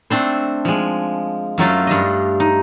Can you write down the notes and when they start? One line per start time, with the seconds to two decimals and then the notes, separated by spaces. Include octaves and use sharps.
0.10 A3 C4 D4 C5
0.65 F3 G#3
1.58 F#2 F#3 A3 F4
1.87 G2 D4 D#5
2.40 D#4